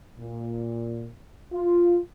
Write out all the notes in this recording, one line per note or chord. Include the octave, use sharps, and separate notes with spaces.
A#2
F4